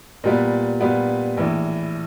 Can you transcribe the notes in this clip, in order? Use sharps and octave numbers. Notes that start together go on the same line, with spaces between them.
A#2 G3 B3
A#2 G3 B3
A#1 A2 E3